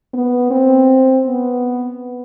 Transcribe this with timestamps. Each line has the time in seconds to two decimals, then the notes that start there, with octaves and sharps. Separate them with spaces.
0.14 B3
0.51 C4
1.26 B3